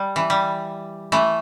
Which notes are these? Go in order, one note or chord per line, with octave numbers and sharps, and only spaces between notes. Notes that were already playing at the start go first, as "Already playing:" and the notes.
Already playing: G3
E3
G3
E3 A3